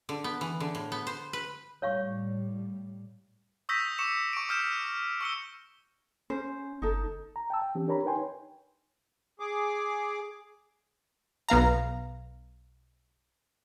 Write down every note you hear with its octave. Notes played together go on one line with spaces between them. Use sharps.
D3
B3
E3
D3
A2
B3
C5
B4
A2 G3 C#5 F5 C#6
C#6 D#6 E6 G6 A#6 B6
C#6 D6 C#7 E7
C#6 D7
D#6 F6 G6 E7
C#6 E6 C#7 G7
C#4 C5
G1 D#4 A4
A#5
G5 A5 E6
G5
E3 C4 C#4 G4
D4 G4 A#4 C#5 A#5 B5
D#4 B4 C#5 G5 G#5 C6
G#4 D6
B1 B3 F5 A#5